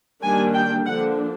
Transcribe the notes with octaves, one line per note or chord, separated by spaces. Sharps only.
D#3 G3 A#3 D4 G#5
G5
D3 F3 A#3 D4 F#5